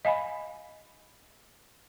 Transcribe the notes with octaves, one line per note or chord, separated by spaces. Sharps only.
D#5 F5 G#5 B5